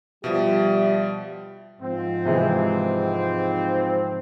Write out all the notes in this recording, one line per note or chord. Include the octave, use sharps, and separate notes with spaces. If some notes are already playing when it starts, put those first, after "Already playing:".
B2 F3 G3 G4 E5
G#2 F3 C4
C3 E3 G#3